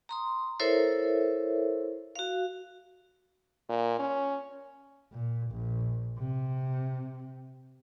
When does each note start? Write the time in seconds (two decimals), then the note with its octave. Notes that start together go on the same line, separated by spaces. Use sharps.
0.09 A#5 C6 D#6
0.60 E4 A4 A#4 C5 C#5 E5
2.15 F#4 F5
3.70 A#2
3.99 C#4
5.13 A#2
5.51 A#1
6.19 C3